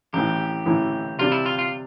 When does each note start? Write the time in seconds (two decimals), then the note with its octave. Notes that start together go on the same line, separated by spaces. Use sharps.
0.13 A1 A2 E3 G4
0.66 A1 A2 E3
1.19 C3 G3 D4 F4
1.32 E4
1.46 F4
1.59 F4